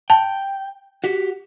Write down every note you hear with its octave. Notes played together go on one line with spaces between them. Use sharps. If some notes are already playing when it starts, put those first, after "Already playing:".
G5 A5
F#4 G4